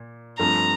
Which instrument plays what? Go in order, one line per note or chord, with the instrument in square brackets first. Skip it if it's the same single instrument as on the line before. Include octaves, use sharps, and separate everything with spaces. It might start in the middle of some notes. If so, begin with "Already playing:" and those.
Already playing: [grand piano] A#2
[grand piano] G2 F3 A3 C4 F4 [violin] A#5